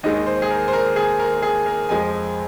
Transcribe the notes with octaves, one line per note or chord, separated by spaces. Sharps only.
D#2 D#3 G#3 D#5
C5
G#4
A#4
C5
A#4
G#4
A#4
G#4
A#4
F2 F3 G#3 G#5